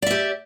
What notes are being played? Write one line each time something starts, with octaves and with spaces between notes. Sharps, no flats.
G4 D5 E5